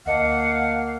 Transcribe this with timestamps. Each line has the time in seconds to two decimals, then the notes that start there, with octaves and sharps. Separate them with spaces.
0.06 D2 A#3 D#5 F5 F#5 A5